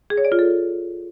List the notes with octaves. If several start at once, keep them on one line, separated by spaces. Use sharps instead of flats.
G#4
C#5
D5
F4
A4